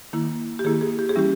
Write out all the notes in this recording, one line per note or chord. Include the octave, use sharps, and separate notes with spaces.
D#3 A#3 E4
G4
D#3 A#3 E4 G#4
G#4
G4
G#4
E3 G3 C#4 E4 G4